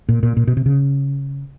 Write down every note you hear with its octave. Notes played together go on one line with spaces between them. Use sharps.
A#2
A#2
A#2
B2
C3
C#3